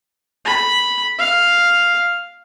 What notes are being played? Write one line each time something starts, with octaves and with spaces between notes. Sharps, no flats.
B5
F5